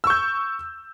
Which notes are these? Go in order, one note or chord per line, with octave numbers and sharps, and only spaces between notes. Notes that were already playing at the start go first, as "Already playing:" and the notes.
C#6 E6 G6